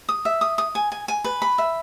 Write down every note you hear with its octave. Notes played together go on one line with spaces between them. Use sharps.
D#6
E5
D#6
D#6
G#5
G#5
G#5
B4
B5
E5